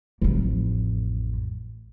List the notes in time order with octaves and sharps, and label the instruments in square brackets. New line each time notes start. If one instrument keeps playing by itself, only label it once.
[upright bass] A1 F2